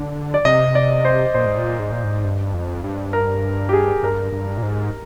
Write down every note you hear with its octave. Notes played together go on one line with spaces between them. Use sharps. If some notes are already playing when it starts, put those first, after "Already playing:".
Already playing: D3
D5
C3 D#5
D5
C5
A#2 C5
G#2
A#2
G#2
A#2
G#2
G2
F2
G2
A#4
G4
G#4
G2 A#4
G2
A#2
G#2